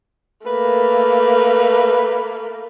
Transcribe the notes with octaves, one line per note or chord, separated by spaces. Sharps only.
A3 A#3 B4